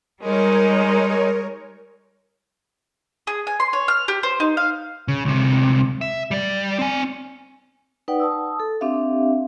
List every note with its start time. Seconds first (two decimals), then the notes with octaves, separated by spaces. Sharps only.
0.20 G3 G#3 D#4 A#4 C#5
3.27 G#4
3.47 G#5
3.60 C6
3.73 C#5
3.88 F6
4.08 G4
4.23 C5
4.40 D#4
4.57 F5
5.08 C#3
5.25 C#2 C3
6.01 E5
6.31 G3 D5
6.79 C4 G#5
8.08 D#4 B4 D5 F#5 G5
8.20 A5 D#6 E6
8.60 A4
8.81 C4 D4 G4 E5 F5